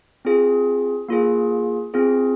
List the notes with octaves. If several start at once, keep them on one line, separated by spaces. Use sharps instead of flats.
C4 F4 G#4
A#3 F4 G#4
C4 F4 G#4